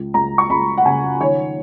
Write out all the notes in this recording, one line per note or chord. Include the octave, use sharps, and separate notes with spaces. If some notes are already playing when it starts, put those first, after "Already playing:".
Already playing: C#2
C#2 A#5
C#6
C#2 B5
F#5
C#3 G#5
D#3 C#5